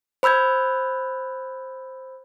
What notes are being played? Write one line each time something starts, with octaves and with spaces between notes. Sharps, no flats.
C5 B5 E6 G6 G#6